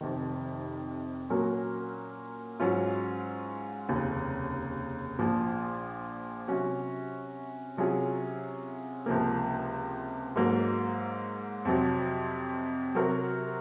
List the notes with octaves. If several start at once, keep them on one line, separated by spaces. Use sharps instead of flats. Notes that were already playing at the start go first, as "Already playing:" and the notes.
F1 F2 C3 D#3
A#2 F#3 C#4 F#4 A#4
G#2 F#3 C#4 F4
F1 D#2 C#3
A#1 A#2 F3
C3 F#3 C#4 F#4
C3 F#3 C#4 F4 G#4
C#2 C3 F3 A#3
G#2 F#3 A#3
F2 C3 F#3 C4
C3 F#3 C4 F#4 A#4